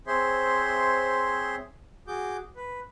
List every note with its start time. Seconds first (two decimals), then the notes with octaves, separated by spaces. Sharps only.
0.07 C4 G#4 C5 C#5 E5 C6
2.08 F#4 G#4 D6 G6
2.56 B4